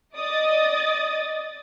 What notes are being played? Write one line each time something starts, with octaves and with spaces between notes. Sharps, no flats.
D5 D#5 D#6 A6